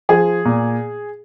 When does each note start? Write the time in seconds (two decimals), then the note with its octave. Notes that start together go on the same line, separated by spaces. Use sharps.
0.09 F3 G#4
0.45 A#2